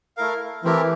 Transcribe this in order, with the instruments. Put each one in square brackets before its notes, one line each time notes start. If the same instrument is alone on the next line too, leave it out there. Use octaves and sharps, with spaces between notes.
[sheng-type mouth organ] A3 E4 A#4 F5
[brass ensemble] E3 [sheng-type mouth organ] A3 C4 E4 G4 A#4